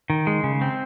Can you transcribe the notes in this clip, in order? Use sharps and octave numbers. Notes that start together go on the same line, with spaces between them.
D#3
G#3
C#3
C4